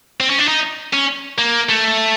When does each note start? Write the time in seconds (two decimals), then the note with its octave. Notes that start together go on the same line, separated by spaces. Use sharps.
0.20 C4
0.30 C#4
0.39 D4
0.48 D#4
0.93 C#4
1.38 A#3
1.69 A3